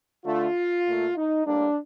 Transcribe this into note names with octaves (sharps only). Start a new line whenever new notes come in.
D3 A3 F4
A#2 A3
D#4
A2 G3 A#3 D4